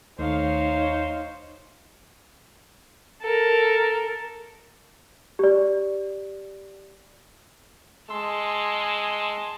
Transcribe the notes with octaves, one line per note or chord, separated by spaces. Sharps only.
D#2 A3 D#4 C5 C#5 F5
A4 A#4
G4 D5
G#3 A5 C6 E6